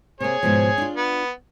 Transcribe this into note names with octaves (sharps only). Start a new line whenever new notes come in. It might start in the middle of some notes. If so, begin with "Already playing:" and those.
C3 A#3 G#4 C#5
G#2 B2 F3
D4 F4
B3